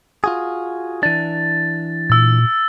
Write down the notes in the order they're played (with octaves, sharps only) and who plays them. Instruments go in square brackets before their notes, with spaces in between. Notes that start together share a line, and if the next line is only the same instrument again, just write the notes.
[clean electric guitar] F4 F#4 G#4
[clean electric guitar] E3 D4 [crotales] A6
[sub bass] A#2 [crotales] E6 A6